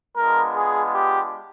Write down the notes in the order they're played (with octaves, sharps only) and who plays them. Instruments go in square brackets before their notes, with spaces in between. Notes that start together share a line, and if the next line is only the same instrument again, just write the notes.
[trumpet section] G#3 B3 D4 F4 A#4
G#4
G4